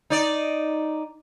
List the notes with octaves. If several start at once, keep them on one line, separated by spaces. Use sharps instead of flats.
D#4 D5